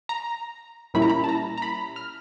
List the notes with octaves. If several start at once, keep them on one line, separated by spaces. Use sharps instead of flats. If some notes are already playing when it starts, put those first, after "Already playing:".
A#5
A#2 G3 A#3 C#4 E4 B5
A#5
B5
A5
A#5
A#5
B5
F6